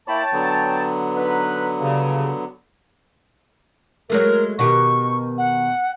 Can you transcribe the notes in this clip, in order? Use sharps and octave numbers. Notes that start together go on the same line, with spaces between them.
A#3 E4 C#5 G5 A5 B5
D3 F#3 B3
D#4 B4
G2 C#3
F#3 G#3 A3 A#4
B2 D#3 G4 C#6
F#5